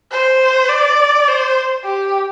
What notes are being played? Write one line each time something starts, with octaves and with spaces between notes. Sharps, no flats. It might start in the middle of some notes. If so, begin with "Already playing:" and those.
C5
D5
C5
G4